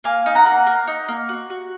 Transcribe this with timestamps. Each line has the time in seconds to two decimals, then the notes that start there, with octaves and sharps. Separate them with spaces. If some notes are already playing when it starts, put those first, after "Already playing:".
0.04 A#3 F5 G#5
0.26 D#4
0.35 F#5 A#5
0.46 A#3
0.67 A#3
0.87 D#4
1.08 A#3
1.29 F#4
1.50 F#4